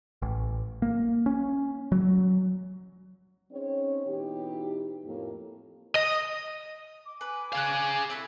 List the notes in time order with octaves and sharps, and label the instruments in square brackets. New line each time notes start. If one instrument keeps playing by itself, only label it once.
[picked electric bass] A1
A#3
C#4
F#3
[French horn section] C4 C#4 D#4 G#4 C#5
B2 E3 D#4 G4
F2 A2 A#3
[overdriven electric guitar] D#5
[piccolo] D6
[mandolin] B4 [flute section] G#5 [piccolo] D6
[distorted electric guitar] G#4 F5 [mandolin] D5 F#6
[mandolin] C4 E4 A4